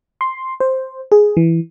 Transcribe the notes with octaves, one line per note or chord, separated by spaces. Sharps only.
C6
C5
G#4
E3